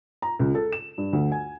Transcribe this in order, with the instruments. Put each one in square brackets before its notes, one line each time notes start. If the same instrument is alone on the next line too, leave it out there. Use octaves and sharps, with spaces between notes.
[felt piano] A#5
C#2
A4
E7
G2
D2
G#5